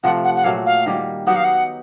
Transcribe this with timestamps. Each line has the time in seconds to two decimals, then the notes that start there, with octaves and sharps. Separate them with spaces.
0.04 C3 F3 A3 F#5
0.24 F#5
0.36 F#5
0.44 A#2 F#3 A3 F5
0.66 F5
0.86 D#3 G3 A#3
1.26 F#3 B3 D#4 G4 F#5
1.36 F5
1.45 F#5